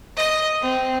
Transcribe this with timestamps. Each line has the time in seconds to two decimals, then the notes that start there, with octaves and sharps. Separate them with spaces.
0.16 D#5
0.61 C4